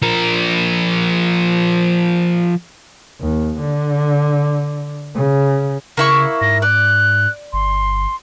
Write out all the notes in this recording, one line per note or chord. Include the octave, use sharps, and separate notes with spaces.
F3 A#4
D#2
D3
C#3
C#3 A#3 E4 C#6
G#2 A#6
D5 F#6
G1 C6